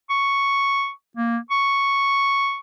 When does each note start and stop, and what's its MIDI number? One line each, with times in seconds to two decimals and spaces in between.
0.10 0.90 85
1.17 1.38 58
1.50 2.59 85